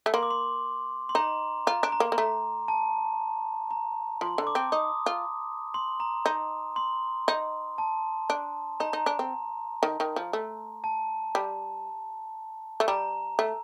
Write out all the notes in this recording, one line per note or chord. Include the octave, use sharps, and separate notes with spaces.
A3
A#3 C6
D6
C6
C6
D#4 A#5
F4 A#5
D4
A#5
A#3
A#3
A3 A#5
A5
A#5
F3 C6
D3
D6
C4
D#4 D#6
F4
C6
A#5
D#4
C6
D#4
A5
D4
D#4 A#5
D#4
D4
C4
D#3
D#3
F3
A3
A5
G3
A3
G3 A#5
A3